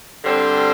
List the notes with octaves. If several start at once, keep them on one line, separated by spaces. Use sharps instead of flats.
G2 D3 G3 C4 C5